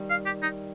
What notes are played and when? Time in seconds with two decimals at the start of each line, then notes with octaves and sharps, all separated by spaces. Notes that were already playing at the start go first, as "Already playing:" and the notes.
Already playing: D#3 G3
0.10 F5
0.26 G4
0.42 D#4